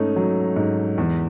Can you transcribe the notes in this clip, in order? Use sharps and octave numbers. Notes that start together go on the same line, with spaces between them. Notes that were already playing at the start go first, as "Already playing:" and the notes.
Already playing: G#2 A3 C#4 D#4
F#3
G#2
E2